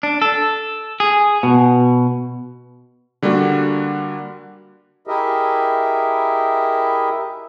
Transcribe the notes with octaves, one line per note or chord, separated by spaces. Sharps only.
D4
A4
G#4
B2
D3 G3 A#3 D4 F#4
E4 G4 G#4 A#4 D#5 E5